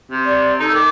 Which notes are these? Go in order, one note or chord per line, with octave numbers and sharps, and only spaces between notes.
C3
D5
D#4 A4
D#3 D6